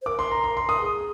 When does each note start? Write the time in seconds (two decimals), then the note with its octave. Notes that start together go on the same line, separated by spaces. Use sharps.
0.02 C5
0.06 A#4 D6
0.19 C6
0.32 A#5
0.44 C6
0.57 C6
0.69 D#6
0.77 A#4
0.81 G#4